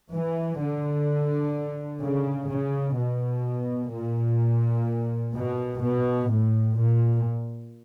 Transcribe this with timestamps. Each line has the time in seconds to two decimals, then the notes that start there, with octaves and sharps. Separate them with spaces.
0.13 E3
0.61 D3
2.02 C#3
2.50 C#3
2.98 B2
3.92 A#2
5.34 B2
5.81 B2
6.29 A2
6.76 A#2